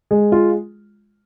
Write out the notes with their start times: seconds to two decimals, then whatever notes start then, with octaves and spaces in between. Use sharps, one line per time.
0.11 G#3
0.32 F4